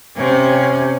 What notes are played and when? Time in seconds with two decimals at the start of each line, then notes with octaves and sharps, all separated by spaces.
0.16 C3 C#4